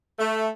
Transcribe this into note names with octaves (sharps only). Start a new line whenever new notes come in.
A3